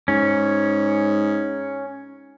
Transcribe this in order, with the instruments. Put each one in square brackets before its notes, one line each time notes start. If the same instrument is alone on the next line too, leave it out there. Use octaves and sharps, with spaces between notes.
[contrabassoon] G#2 [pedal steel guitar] C#4